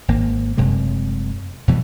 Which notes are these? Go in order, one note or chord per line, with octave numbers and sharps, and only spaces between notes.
G#1 A#3
F1 F#2 C3 G#3
F2 B2 E3 G3